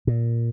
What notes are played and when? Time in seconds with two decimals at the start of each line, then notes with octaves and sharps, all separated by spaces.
0.07 A#2